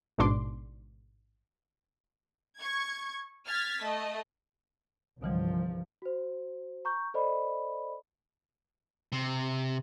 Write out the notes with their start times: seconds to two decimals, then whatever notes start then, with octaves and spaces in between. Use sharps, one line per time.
0.18 A1 G#2 B2 D4 C6 D6
2.58 C#6 G#6
3.46 F6 G#6 A6 B6
3.83 A3 D#5
5.23 C2 G2 D3 E3 F3 G3
6.02 F#4 C5
6.85 A#5 C#6 G6
7.14 A4 C5 D5 D#5 B5
9.12 C3